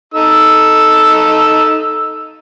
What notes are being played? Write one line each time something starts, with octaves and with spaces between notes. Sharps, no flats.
D#4 A4 E6